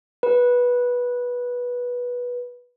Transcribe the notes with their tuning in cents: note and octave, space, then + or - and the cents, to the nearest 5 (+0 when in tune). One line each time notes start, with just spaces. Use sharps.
B4 -15